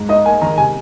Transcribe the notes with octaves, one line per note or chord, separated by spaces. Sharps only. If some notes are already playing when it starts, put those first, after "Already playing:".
Already playing: G#2
D#4 D#5
A#3 G#5
D#3 A#5
C3 G#5